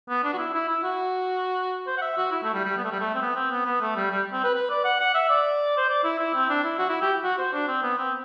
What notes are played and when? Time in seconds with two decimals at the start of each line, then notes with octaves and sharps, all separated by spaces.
0.09 B3
0.24 D4
0.33 F#4
0.38 E4
0.54 E4
0.69 E4
0.83 F#4
1.87 C5
1.97 F#5
2.02 E5
2.17 F#4
2.31 E4
2.43 A3
2.54 G3
2.65 G3
2.77 B3
2.84 A3
2.92 G3
3.00 A3
3.15 C4
3.22 B3
3.36 C4
3.51 B3
3.66 B3
3.81 A3
3.96 G3
4.11 G3
4.33 C4
4.44 B4
4.55 B4
4.70 D5
4.84 F#5
5.00 F#5
5.14 E5
5.29 D5
5.78 C5
5.89 D5
6.04 E4
6.19 E4
6.34 C4
6.49 D4
6.64 E4
6.78 F#4
6.89 E4
7.02 G4
7.23 F#4
7.38 C5
7.53 D4
7.68 C4
7.82 B3
7.98 C4